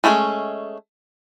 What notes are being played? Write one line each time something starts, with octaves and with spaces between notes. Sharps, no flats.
G#3 A3 C#4 E4 G#4